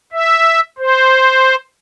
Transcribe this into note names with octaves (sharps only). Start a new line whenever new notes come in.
E5
C5